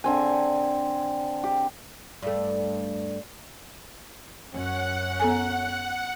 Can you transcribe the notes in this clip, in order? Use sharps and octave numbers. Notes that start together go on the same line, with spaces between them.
D3 C4 G#5
G4
G2 A3
F#2 C#4 F#5
B3 A4 G#5